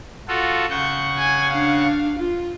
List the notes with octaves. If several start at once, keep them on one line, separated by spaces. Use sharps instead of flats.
F4 F#4 A4
C#3 F#5 C#6 G6
G#5
D4 F5
F4